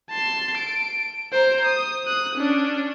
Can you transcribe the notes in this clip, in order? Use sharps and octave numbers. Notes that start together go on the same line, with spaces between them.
A5 C6
D7
C5 A#5
D#6
D#6 F#6
C#4 D4